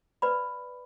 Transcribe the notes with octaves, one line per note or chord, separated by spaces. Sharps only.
B4 D5 B5